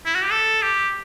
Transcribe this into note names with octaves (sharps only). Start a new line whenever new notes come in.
E4
F#4
G4
A4
G4